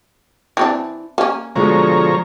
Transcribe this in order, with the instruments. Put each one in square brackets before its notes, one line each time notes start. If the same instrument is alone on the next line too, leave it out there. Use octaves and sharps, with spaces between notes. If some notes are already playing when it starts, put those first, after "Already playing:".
[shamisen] E3 C4 D4
A#3 C#4
[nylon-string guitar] B2 D3 G#3 [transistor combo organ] F3 C#5 A#5